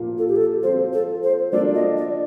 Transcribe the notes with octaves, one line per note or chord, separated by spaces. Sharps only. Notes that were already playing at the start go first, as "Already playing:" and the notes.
Already playing: A#2 F3 A#3
A4
G4
A4
F3 C4 F4 C5
A4
C5
F3 A#3 D4 A4 D5
D#5
D5